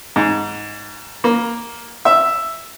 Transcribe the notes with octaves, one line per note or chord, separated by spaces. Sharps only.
G#2
A#3
E5